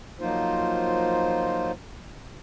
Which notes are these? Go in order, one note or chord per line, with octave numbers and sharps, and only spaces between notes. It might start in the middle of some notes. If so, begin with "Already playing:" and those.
F3 F#3 A#3 D#4 F4 C5